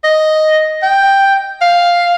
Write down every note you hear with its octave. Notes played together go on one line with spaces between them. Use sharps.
D#5
G5
F5